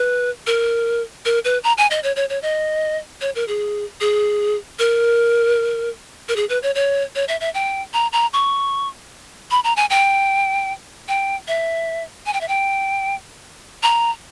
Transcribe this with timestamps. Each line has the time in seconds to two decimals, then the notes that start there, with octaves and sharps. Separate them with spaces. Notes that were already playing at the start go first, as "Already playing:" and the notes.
Already playing: B4
0.47 A#4
1.25 A#4
1.45 B4
1.64 A#5
1.78 G#5
1.91 D#5
2.03 C#5
2.16 C#5
2.29 C#5
2.42 D#5
3.21 C#5
3.35 A#4
3.48 G#4
4.00 G#4
4.79 A#4
6.28 A#4
6.36 G#4
6.49 B4
6.63 C#5
6.75 C#5
7.15 C#5
7.28 E5
7.40 E5
7.54 G5
7.93 A#5
8.13 A#5
8.33 C#6
9.51 B5
9.64 A#5
9.76 G#5
9.90 G5
11.08 G5
11.48 E5
12.26 G#5
12.33 G5
12.41 E5
12.48 G5
13.83 A#5